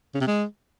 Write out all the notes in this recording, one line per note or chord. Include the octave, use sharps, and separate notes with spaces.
C#3
C3
G#3